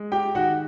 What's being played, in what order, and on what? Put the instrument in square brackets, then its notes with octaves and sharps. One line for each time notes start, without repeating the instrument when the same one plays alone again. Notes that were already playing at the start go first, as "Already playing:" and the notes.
Already playing: [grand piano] G#3
G4 G5
D#3 F#4 F#5